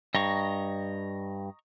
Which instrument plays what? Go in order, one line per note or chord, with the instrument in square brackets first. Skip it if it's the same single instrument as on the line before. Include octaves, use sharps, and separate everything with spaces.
[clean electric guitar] G2 [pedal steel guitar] D#5 A#5 C#6